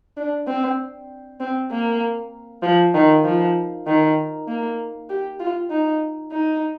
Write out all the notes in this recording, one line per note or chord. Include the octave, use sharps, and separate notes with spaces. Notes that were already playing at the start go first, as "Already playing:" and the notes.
D4
C4
C4
A#3
F3
D#3
F3
D#3
A#3
G4
F4
D#4
D#4